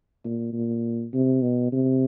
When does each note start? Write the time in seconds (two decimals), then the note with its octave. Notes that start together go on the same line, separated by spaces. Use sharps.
0.24 A#2
0.53 A#2
1.13 C3
1.42 B2
1.72 C3